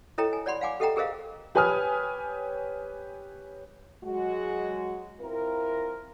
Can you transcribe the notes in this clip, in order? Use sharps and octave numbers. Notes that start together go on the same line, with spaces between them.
E4 A4 C#5 D#5 G5 A#5
G#5
C#5 D5 F#5 B5 C6
F5 F#5 G#5 D6
G4 A4 D#5 F#5 G5 A#5
G4 G#4 A#4 C5 D#5 F5
G4 B4 C#5 G#5 D#6 F6
F#3 G#3 F#4
C4 E4 F4 A#4